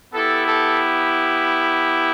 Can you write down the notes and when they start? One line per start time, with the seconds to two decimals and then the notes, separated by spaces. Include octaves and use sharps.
0.13 B3 E4 G4 A4
0.46 A4